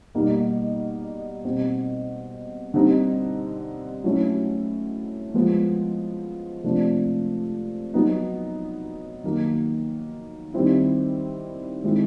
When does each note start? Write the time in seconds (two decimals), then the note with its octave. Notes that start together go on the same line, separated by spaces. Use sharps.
0.15 B2 G3 A#3 D#4
1.44 B2 G3 C4
2.74 D3 G3 C4 D#4
4.04 F#3 A3 C#4 E4
5.34 F3 G#3 B3
6.64 C3 F3 A3 D4
7.94 F#3 B3 D#4
9.24 D#3 F#3 A#3
10.54 D#3 G3 C4 E4
11.84 D#3 G#3 C4 E4